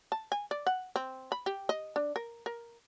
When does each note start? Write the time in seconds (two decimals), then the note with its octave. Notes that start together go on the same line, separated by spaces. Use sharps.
0.12 A5
0.32 G#5
0.51 D5
0.67 F#5
0.96 C4
1.32 B5
1.46 G4
1.69 D#5
1.96 D4
2.16 A#4
2.46 A#4